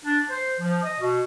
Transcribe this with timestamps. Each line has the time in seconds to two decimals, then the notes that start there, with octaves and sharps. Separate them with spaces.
0.05 D4
0.30 C5
0.59 F3
0.82 D#5
0.99 B2